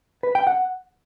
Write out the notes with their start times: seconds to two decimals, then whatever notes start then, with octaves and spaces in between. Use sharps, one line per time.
0.23 B4
0.35 G5
0.47 F#5